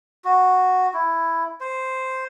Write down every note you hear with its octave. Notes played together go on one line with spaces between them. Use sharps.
F#4
E4
C5